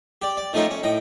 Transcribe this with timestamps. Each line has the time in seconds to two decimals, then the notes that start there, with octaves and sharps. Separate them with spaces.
0.22 G4 D5
0.37 D5
0.53 D#3 F3 A3 C#4 D#4 F4
0.71 C#4
0.83 A2 D#5 G5